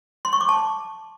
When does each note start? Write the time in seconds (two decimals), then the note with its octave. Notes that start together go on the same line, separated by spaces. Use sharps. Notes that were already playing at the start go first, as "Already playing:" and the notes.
0.25 C6
0.33 C#6
0.41 D6
0.49 A5